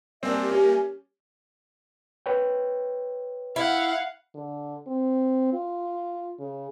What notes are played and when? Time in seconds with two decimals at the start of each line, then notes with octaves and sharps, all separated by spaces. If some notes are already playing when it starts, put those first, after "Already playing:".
0.23 G3 A#3 C4 D4 A#4 E5 G#5
0.51 C#4 G4
2.26 B4 C#5 G5
3.56 E4 F5 F#5
4.35 D3
4.87 C4
5.53 F4
6.39 C#3